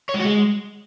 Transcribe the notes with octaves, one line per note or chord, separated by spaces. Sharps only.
C#5
G#3
F#4
G#3